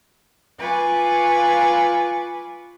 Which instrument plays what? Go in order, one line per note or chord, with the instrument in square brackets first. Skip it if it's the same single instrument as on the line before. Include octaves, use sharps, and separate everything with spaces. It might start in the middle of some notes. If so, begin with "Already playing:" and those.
[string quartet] F4 B4 G#5 B5 C#6 D6